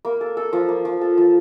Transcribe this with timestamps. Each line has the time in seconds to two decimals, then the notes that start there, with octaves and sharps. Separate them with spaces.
0.05 A#3
0.21 A4
0.37 A4
0.53 F3
0.69 A#3
0.85 F3
1.01 A4
1.18 F3